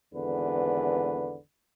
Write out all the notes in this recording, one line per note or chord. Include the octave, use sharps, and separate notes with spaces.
G#1 E2 D3 B4